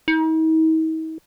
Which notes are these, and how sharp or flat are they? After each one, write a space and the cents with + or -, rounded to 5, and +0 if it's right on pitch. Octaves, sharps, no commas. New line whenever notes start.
D#4 +45